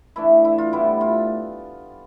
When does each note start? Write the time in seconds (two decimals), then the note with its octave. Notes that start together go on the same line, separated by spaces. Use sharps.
0.16 E3 A3 D4 E4
0.45 E4
0.58 F4
0.73 A2 G3 B3 E4
1.01 F4